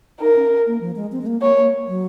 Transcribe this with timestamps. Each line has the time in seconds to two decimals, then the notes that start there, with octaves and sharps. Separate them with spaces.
0.20 D#4 A#4
0.36 C#4
0.67 A#3
0.81 F3
0.96 G#3
1.12 C4
1.22 G#3
1.27 A#3
1.41 A#3 C#5
1.57 A#3
1.88 F#3